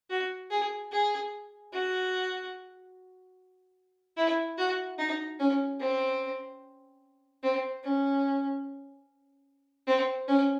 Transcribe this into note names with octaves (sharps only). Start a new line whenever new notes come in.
F#4
G#4
G#4
F#4
E4
F#4
D#4
C#4
C4
C4
C#4
C4
C#4